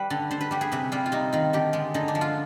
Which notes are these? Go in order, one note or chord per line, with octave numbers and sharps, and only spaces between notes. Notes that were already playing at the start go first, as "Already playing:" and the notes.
Already playing: G3 B4
D3
D3 C5
B4
G3 G4
G#4
C3 B4
G3 F4
F4
C3 D#4
D#3 F4
D3 G4
G#3
D3 D#4
D4
F3
F4